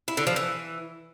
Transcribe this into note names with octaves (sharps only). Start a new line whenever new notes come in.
E4
D3
F3
E3